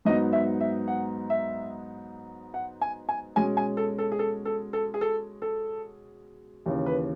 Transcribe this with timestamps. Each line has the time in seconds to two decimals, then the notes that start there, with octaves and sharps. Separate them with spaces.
0.05 G#2 F#3 B3 D#4 D#5
0.33 E5
0.60 E5
0.88 F#5
1.30 E5
2.54 F#5
2.81 G#5
3.09 G#5
3.36 B2 G#3 C#4 G#5
3.57 G#5
3.77 A4
3.98 A4
4.12 G#4
4.19 A4
4.45 A4
4.73 A4
4.94 G#4
5.01 A4
5.42 A4
6.66 D#2 C#3 E3
6.86 B4